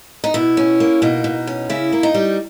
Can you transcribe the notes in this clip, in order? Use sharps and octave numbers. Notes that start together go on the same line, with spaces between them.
D#4
B2 E4
C#4
A#3
B2 D#4
B2
C#4
C#3 E4
A#3
D#4
G3